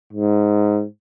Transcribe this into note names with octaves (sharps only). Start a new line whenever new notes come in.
G#2